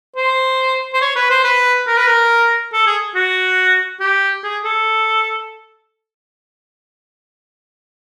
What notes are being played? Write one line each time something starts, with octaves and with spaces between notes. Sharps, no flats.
C5
C5
C#5
B4
C5
B4
A#4
B4
A#4
A4
G#4
F#4
G4
G#4
A4